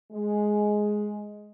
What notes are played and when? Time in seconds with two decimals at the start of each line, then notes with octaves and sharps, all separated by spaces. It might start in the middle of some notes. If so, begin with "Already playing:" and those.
0.12 G#3